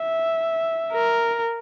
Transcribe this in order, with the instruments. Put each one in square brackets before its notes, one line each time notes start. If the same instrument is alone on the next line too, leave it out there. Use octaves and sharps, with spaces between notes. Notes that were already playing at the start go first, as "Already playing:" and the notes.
Already playing: [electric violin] E5
A#4